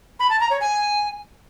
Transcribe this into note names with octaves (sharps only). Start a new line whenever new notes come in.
B5
A5
A#5
C#5
G#5